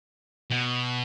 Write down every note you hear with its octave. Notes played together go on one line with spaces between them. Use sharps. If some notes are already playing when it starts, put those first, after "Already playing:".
B2